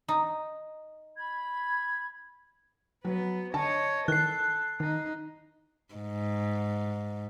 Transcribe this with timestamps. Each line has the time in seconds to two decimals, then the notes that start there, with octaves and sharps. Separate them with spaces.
0.08 D#4
1.17 B5 G#6
3.05 F#3 B3 B4
3.54 D3 C#5 D#5 A5
4.08 D#3 E3 A4 F#6 C7
4.80 D#3 D#4
5.95 G#2